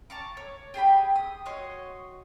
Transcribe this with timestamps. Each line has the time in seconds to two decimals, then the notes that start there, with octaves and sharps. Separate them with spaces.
0.10 A5 A#5 C#6 D6
0.37 C#5
0.74 G4 G#4 G5 B5
1.15 D#6
1.46 F#4 C#5 D#5 C6